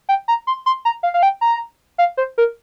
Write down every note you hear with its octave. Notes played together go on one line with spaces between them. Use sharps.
G5
A#5
C6
C6
A#5
F5
F5
G5
A#5
F5
C5
A#4